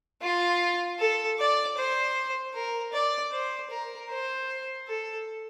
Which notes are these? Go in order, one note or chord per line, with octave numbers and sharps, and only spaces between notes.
F4
A4
D5
C5
A#4
D5
C5
A#4
C5
A4